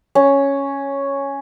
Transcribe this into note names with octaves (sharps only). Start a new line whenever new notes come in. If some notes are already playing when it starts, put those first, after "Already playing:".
C#4